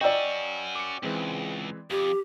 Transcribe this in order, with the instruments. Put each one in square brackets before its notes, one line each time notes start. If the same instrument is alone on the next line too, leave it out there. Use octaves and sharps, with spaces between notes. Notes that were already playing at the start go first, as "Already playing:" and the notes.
[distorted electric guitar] C#4 F#4 [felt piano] D5 G5 [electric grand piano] D#5 A#5 E6
[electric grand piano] D6 C#7
[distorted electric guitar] C#2 [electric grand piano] E3 G#3 C4
[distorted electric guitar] F2 [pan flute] G4